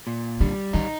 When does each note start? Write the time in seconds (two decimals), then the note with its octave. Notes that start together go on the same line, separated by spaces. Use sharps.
0.07 A#2
0.40 D3 G3
0.73 D#3 D#4